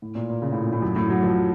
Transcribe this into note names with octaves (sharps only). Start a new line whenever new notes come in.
A2
A#2
A#2
C#3
A2
A#2
A2
F#2
A2
F#3
F3